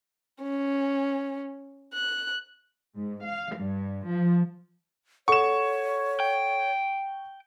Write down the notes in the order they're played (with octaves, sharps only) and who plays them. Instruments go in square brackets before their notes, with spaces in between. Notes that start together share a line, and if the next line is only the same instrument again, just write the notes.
[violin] C#4
F#6
[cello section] G#2
F5
G2
F3
[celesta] A4 F#5 [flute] C#5 [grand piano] C#6 E7
[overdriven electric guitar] G5